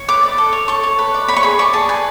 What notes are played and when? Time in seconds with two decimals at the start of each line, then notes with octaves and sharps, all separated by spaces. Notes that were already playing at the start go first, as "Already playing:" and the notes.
Already playing: C#5
0.08 B4 D6
0.23 D5
0.38 A4
0.53 C#5
0.68 A4 C#6
0.83 C#5
0.99 B4
1.14 D5
1.28 C#5 B5
1.36 C#6
1.43 G#4 B5
1.59 D5 C#6
1.73 G#4 A5
1.89 B4 G#5